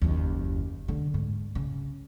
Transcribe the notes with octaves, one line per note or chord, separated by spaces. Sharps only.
F#1 D#2
D3
G#2
C#3